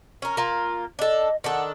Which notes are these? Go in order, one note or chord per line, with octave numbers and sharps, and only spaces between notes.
C#4 A#4
A#3 F4
D4 A4 D#5
D#3 D4 A4 F#5